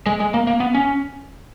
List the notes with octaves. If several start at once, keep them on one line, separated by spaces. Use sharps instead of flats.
G#3
G#3
A#3
A#3
B3
C#4